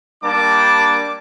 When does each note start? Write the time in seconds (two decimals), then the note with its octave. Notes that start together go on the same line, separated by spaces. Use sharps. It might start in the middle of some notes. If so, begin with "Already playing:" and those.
0.23 G3 A#3 D4 A5 D6